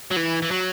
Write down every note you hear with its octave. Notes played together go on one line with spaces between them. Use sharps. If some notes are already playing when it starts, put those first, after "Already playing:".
F#3
E3
E3
F#3